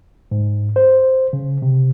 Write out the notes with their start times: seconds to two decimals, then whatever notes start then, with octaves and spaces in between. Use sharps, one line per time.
0.31 G#2
0.76 C5
1.33 C#3
1.62 C3